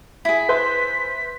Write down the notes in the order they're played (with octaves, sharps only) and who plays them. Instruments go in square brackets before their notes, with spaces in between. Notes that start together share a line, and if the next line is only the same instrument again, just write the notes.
[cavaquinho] E4 G#4 [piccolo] B6
[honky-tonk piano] B4 C5 E5